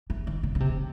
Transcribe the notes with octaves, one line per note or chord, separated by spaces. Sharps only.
E3
D#3
D3
C#3
C3